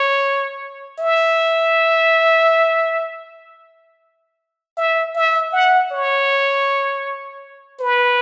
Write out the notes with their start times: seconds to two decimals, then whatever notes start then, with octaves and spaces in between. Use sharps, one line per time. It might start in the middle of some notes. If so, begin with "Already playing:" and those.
Already playing: C#5
0.99 E5
4.77 E5
5.15 E5
5.53 F#5
5.92 C#5
7.81 B4